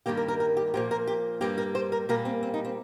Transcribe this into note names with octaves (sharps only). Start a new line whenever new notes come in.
G2 D#3 G3 A#3 G4
A#4
A#4
A#4
G4
A#2 F3 A#3 G4
A#4
G4
G2 G3 A#3 G4
A#4
C5
A#4
A#2 G3 A#3 A#4
C4
C4
D#4
C4